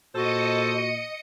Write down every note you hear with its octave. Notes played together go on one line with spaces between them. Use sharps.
A#2 F#4 A4 C5 D#5 D#6 C#7